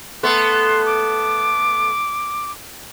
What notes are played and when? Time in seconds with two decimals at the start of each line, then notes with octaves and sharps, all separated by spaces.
0.23 A3 B3 C6
0.86 D6